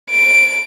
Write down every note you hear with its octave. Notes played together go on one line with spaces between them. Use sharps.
D7